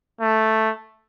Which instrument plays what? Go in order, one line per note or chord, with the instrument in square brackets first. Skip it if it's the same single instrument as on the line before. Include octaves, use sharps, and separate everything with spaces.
[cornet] A3